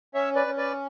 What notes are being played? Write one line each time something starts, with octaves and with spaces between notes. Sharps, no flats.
C#4 C#5 E5
B4 D5
C#4
B4 D5